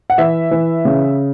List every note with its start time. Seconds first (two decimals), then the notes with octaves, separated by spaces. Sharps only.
0.10 F#5
0.18 E3 E5
0.51 E3
0.85 C#3